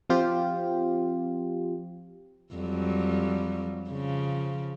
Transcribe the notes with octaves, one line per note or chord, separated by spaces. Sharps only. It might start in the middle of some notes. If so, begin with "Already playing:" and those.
F3 C4 F4 G4
F2 F#3 G3
C#3 F3